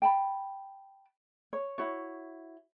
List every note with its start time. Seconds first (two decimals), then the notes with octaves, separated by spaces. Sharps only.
0.02 G5 A5 B5
1.53 C#5
1.78 E4 F#4 C#5